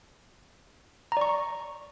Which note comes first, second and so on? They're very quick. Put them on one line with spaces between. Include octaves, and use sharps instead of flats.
A#5 D5 C#6